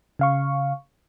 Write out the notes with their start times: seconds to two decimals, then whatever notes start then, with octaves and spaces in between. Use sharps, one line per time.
0.19 C#3 F5 C#6